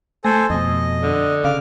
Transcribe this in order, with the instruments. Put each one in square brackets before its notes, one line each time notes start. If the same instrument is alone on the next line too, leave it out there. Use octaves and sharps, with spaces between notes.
[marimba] A3 [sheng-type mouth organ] A4 C5 G#5
[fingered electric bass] F2 B2 [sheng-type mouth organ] D#5
[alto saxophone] D3
[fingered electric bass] C#3 [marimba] F5 [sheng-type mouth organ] D6 F6